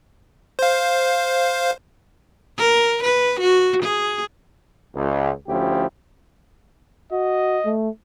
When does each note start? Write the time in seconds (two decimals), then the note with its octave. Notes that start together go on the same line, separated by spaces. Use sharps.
0.59 C5 F5
2.58 A#4
3.03 B4
3.40 F#4
3.83 G#4
4.95 C#2
5.48 D2 F3 C#4 E4 G4
7.12 F#4 D#5
7.65 A3